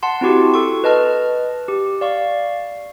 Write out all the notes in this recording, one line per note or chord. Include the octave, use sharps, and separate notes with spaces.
F#5 A5 C6
C4 E4 F#4 G4
A4 C#6
B4 D#5 A5 F6
G4
D5 F5 C#6